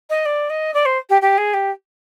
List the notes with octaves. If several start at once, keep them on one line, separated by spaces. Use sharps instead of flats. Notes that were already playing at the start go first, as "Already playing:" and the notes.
D#5
D5
D#5
D5
C5
G4
G4
G#4
G4